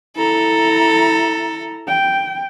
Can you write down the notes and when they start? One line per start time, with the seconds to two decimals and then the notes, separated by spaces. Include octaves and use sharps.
0.16 E4 A4 A#5
1.87 G5